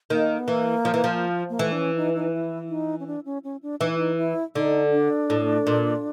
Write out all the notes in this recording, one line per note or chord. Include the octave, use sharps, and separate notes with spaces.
D#3 A#3
B3
E3 A#3
F3
E3
F3
A#3
E3 A3
D4
C#4
D#4
D#4
E4
D#4
C#4
D4
C#4
C#4
D4
E3 D#4
E4
D#4
E4
D3 D#4
D4
A2
A#2